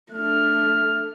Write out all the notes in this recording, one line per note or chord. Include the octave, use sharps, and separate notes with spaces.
A3 D4 F6